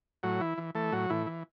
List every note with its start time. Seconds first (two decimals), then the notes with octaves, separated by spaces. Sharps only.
0.23 A2 F#3 F#4
0.40 E3 E4
0.58 E3
0.75 E3 A3 A4
0.92 A2 F#3 F#4
1.10 A2 E3 E4
1.27 E3